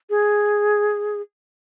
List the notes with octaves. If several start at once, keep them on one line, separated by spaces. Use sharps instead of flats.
G#4